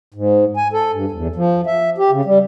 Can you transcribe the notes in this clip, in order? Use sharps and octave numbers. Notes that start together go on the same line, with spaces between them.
G#2
G#5
A4
G2
E2
F3
E5
G4
C#3
G3